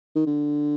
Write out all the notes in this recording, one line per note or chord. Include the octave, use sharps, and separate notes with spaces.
D#3
D3